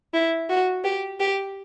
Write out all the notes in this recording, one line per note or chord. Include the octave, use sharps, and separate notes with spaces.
E4
F#4
G4
G4